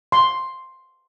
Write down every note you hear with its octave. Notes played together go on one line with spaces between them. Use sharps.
C6